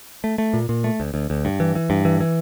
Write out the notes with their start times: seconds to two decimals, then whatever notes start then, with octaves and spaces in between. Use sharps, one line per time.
0.24 A3
0.38 A3
0.53 A#2
0.69 A#2
0.84 A3
1.00 D2
1.14 D2
1.30 D2
1.45 G2
1.60 E3
1.75 E3
1.90 G2
2.05 E3
2.20 E3